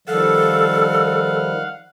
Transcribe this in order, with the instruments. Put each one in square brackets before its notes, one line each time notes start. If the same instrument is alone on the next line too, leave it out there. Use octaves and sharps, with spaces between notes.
[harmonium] D#3 F3 G3 [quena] A4 [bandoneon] F5 F#5